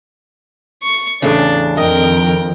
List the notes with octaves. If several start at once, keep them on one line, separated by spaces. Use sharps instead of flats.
C#6
E2 A2 C#3 D4
F2 D#3 A#4 D#5 G5